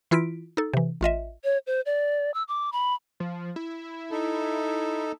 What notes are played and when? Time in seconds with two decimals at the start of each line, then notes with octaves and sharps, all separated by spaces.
0.11 E3 E4 F4 B6 D7
0.57 D#4 A4
0.74 C3 E3
1.01 A1 F4 D#5 E5
1.44 C#5
1.67 C5
1.86 D5
2.34 E6
2.48 D6
2.72 B5
3.20 F3
3.56 E4
4.11 D#4 A4